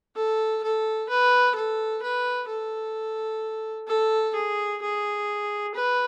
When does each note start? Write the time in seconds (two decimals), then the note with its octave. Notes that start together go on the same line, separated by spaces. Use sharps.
0.16 A4
0.63 A4
1.10 B4
1.55 A4
2.02 B4
2.49 A4
3.88 A4
4.35 G#4
4.82 G#4
5.75 B4